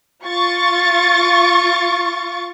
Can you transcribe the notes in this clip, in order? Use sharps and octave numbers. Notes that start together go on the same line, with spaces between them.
F4 C#6 A6